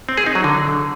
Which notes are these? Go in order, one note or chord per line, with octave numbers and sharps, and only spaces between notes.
C4
G#4
D#4
F#3
D3